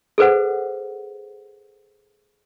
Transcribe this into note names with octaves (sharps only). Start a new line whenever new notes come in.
G#4 A4 B4 C5 F#5